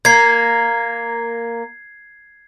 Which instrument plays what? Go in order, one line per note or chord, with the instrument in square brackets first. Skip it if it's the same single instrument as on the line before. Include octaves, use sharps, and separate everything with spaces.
[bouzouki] A#3 [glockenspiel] G#6 C7